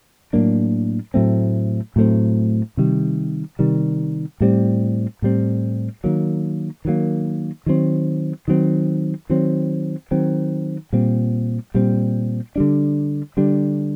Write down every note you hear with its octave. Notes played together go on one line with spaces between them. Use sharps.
A2 F#3 A#3 D4
A2 F#3 A3 C4
A2 F#3 A3 C4
C3 D#3 G3
C3 D#3 G3
A2 G3 C4
A2 G3 C4
D#3 F#3 A#3
D#3 F#3 A#3
D#3 F#3 C4
D#3 F#3 C4
D#3 F#3 C4
D#3 F#3 C4
A#2 G3 C4
A#2 G3 C4
D3 G3 D4
D3 G3 D4